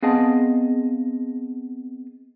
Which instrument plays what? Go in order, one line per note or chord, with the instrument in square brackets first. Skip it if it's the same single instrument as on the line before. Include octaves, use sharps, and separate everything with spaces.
[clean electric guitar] B3 C4 G#4 D#5 F5 A5